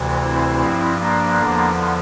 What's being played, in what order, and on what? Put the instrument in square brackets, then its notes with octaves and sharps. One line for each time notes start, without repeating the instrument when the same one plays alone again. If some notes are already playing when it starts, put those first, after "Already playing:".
Already playing: [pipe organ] D2 C3 E3
C4 E4
G2 F3
A#3 D4
E2 D3 F3